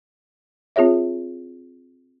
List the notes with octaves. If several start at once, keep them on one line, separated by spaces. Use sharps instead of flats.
C4 F4 G#4 C#5 E5